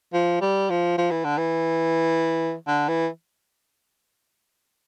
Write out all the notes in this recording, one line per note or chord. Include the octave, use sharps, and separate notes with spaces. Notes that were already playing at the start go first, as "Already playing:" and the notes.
F3
G3
F3
F3
E3
D3
E3
D3
E3